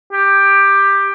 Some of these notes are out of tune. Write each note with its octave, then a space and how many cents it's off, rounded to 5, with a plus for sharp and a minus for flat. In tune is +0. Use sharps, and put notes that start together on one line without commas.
G4 +10